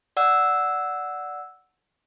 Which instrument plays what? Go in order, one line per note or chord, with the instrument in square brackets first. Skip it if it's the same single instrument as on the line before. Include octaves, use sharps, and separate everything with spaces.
[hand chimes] D5 F#5 E6